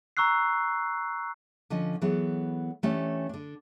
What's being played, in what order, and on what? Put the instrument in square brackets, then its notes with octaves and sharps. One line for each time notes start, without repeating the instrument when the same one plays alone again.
[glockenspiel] A#5 C#6 E6 F#6 C7
[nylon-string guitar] D3 F3 C#4 D#5
E3 F#3 B3 G#4 A4 C#5
E3 A3 C#4 D4 G4 C#5
D3 D4